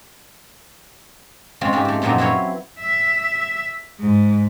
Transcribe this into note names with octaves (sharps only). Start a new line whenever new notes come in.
C#3 G#3 C4 F4
G#2 G#3 C4 G4
A3 C4
F#2 A#2 F3 F#3 D#4
F#3 C4 E4 B4 C#5 F5
E5
G#2